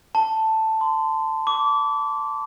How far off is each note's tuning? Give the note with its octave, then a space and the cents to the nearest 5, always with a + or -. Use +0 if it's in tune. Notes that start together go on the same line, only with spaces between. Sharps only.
A5 +5
C6 -20
D6 -30